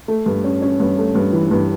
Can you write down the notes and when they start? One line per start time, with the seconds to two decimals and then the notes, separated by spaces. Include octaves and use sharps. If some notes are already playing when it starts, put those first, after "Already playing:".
0.08 A3
0.26 G2
0.44 C#4
0.62 C#4
0.80 G2
0.98 A3
1.15 G2
1.33 E3
1.51 G2